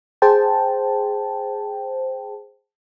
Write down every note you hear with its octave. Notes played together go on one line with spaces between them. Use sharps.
G#4 C5 G5 A5